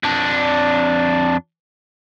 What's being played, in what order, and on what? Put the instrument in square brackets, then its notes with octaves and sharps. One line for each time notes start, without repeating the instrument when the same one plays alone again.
[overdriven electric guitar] F2 D4